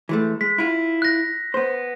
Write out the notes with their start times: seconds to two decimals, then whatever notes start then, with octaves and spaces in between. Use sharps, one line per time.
0.09 E3 G#3 A3
0.41 G#3 B6
0.58 E4 F4
1.02 F#6 A#6
1.54 B3 C5